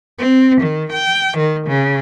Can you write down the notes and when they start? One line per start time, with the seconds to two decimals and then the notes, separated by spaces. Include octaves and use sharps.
0.19 C4
0.62 D#3
0.93 G5
1.38 D#3
1.68 C#3